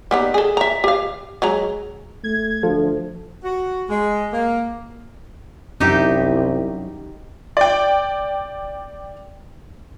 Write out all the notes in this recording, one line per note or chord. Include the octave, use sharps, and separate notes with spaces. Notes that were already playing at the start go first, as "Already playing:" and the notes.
G3 B3 D#4
G#4 A4
E5 A#5
G4 F5
F#3 G#3 A#5
A3 G#6
D2 F3 A4
F#4
G#3
A#3
C2 F#2 E3 D#4 G4 E5
D5 G5